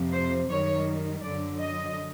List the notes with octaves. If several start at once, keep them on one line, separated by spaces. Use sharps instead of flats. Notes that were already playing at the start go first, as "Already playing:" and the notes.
Already playing: F2 C3 F3
C5
F#2 D#3 G3 C#5
F#2 D3 F#3 D5
D#5